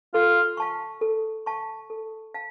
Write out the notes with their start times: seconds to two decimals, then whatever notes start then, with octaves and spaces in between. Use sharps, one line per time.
0.14 F4 A4
0.57 F5 A5 C#6
1.01 A4
1.46 F5 A5 C#6
1.90 A4
2.34 F5 A5